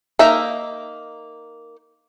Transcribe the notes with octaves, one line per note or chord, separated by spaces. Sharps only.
A#3 D#4 A#4 E5